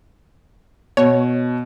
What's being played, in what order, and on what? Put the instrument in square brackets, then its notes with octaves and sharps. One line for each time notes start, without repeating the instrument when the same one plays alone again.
[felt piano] B2 [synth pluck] C#5